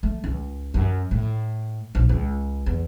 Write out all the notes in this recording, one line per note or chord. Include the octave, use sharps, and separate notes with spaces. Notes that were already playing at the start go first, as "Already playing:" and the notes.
A3
C#2
F#2
A2
A#1
C#2
E2